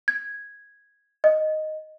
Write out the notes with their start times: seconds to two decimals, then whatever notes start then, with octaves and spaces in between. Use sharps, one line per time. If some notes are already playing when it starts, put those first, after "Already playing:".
0.08 G#6
1.24 D#5